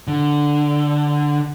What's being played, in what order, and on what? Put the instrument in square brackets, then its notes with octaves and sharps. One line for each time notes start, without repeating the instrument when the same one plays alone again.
[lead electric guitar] D3